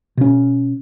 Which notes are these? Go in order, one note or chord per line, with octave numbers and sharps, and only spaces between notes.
B2 C#4